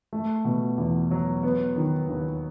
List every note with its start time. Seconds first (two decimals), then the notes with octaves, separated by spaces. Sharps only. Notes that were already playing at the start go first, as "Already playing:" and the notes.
0.13 A3
0.44 B2
0.78 E2
1.11 F#3
1.43 B3
1.76 D#3
2.08 D#2